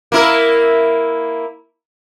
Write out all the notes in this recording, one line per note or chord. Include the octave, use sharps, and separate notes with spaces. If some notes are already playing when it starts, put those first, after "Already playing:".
A#3 E4 A#4